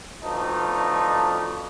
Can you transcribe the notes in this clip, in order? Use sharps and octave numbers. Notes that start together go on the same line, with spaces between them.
F2 B2 F3 A3 D4 D#4